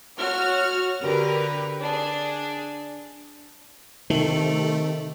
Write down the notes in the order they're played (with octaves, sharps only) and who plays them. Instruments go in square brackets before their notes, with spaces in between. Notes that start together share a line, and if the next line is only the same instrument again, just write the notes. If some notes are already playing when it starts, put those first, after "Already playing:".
[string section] F#4 C#5 F6
D3 G4 A#4 B4
D4 G#4
[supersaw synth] C3 A3 [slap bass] D#3